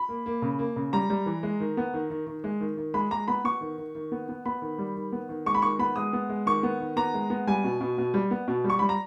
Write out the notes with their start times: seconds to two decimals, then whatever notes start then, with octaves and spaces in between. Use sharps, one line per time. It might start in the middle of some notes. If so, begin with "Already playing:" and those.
Already playing: B5
0.09 A#3
0.26 A#3
0.42 C#3
0.59 A#3
0.76 C#3
0.93 G3 A#5
1.10 G3
1.26 E3
1.43 G#3
1.60 D#3
1.77 B3
1.94 D#3
2.10 D#3
2.27 D#3
2.44 G#3
2.60 D#3
2.77 D#3
2.94 G#3 B5
3.11 G#3 A#5
3.28 B3 B5
3.44 B3 C#6
3.61 D#3
3.78 D#3
3.95 D#3
4.12 B3
4.29 B3
4.46 B3 B5
4.62 D#3
4.78 G3
4.96 D#3
5.12 B3
5.29 D#3
5.46 G#3 C#6
5.55 B5
5.62 D#3 C#6
5.79 B3 B5
5.96 G#3 D#6
6.13 B3
6.29 G#3
6.46 D#3 C#6
6.63 B3
6.80 D#3
6.96 B3 A#5
7.14 G#3
7.30 B3
7.47 G3 G#5
7.64 B2
7.81 B2
7.98 B2
8.14 G3
8.31 B3
8.48 B2
8.64 G3
8.70 C#6
8.79 G3 B5
8.89 A#5